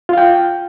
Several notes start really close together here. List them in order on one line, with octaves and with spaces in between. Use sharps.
F4 F5 G5